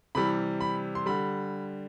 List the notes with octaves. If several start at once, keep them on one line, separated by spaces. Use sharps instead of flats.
C3 E3 G3 B5
B5
C6
D3 G3 B5